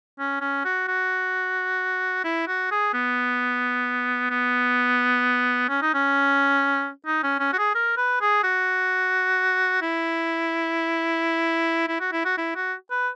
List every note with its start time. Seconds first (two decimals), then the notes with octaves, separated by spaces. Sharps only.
0.19 C#4
0.41 C#4
0.65 F#4
0.88 F#4
2.24 E4
2.47 F#4
2.71 G#4
2.94 B3
4.30 B3
5.69 C#4
5.82 D#4
5.94 C#4
7.06 D#4
7.23 C#4
7.40 C#4
7.53 F#4
7.58 G#4
7.75 A#4
7.97 B4
8.21 G#4
8.43 F#4
9.82 E4
11.88 E4
12.00 F#4
12.12 E4
12.25 F#4
12.37 E4
12.55 F#4
12.91 B4